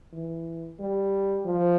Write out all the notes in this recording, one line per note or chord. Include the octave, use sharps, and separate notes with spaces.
E3
G3
F3